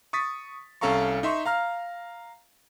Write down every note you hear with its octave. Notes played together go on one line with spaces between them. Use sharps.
C#6 D#6 A6 B6
C2 C#4 A4 F5 A#5 C#6
D#4 E5 C6 C#6
F5 A#5 F6